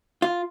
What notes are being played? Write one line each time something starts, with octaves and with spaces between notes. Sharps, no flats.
F4